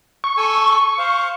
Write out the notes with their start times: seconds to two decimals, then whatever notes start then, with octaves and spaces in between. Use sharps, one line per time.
0.24 C#6
0.37 A4 G#5 E6
0.98 C5 F5